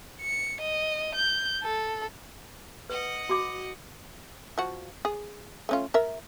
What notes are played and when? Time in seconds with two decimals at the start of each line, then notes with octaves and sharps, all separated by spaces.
0.21 C#7
0.61 D#5
1.15 G6
1.63 A4
2.90 B4 D#5 F#5
3.29 F#4 D6
4.58 F3 F#4
5.05 G#4
5.69 A3 C#4 F4
5.94 A#4 E5